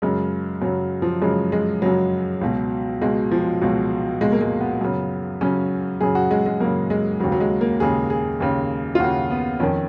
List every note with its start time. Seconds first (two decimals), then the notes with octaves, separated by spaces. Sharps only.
0.02 F#2 C#3 G#3
0.62 F#2 C#3 F#3
1.02 F3
1.22 F#2 C#3 G#3
1.52 G#3
1.82 F#2 C#3 F#3
2.41 C#2 B2
3.01 C#2 B2 G#3
3.31 F3
3.61 C#2 B2 F#3
4.21 C#2 B2 G#3
4.32 A#3
4.41 G#3
4.61 B3
4.81 F#2 C#3
5.41 F#2 C#3 C#4
6.01 F#2 C#3 G#4
6.15 F#4
6.31 G#3
6.46 G#3
6.60 F#2 C#3 A#3
6.90 G#3
7.20 C#3 F#3
7.24 D#2
7.32 F#3
7.40 G#3
7.61 A#3
7.80 D#2 C#3 G#4
8.10 G#4
8.40 D#2 C#3
8.95 F4
9.00 D#2 C#3 F#4
9.30 B3
9.60 F2 D#3 C#4